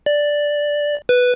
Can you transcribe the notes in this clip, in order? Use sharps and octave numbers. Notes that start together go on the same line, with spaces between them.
D5
B4